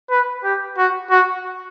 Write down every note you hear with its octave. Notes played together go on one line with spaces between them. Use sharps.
B4
G4
F#4
F#4